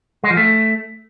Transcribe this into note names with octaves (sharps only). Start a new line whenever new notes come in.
G#3
F3
A3